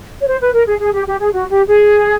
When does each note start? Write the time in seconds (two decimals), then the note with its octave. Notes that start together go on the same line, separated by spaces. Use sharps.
0.22 C#5
0.28 C5
0.41 B4
0.53 A#4
0.67 G#4
0.80 G#4
0.93 G4
1.07 G4
1.20 G#4
1.33 F#4
1.49 G4
1.67 G#4